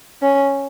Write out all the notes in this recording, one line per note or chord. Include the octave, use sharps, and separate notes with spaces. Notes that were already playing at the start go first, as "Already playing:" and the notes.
C#4